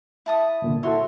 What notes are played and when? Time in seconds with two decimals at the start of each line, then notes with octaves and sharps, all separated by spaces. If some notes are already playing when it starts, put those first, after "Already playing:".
0.26 E4 A5 D#6
0.62 C2 A#2 D3
0.83 E4 F#4 A4 C#5 E5 C6